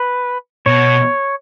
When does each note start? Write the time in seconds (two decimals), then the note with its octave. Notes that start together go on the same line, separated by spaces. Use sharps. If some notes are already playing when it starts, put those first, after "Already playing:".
Already playing: B4
0.66 B2 C#5